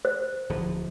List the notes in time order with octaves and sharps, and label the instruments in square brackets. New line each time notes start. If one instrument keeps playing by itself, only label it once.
[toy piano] C5
[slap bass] D1 D2 F3